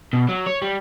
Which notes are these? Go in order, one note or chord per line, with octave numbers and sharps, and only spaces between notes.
B2
F#3
C#5
G3